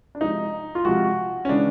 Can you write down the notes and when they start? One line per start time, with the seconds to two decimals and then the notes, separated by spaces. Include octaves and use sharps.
0.15 D4
0.21 C3 F3 G#3 D#4
0.75 F4
0.85 C3 F3 G#3 F#4
1.45 C#4
1.49 C#3 E3 G#3 D4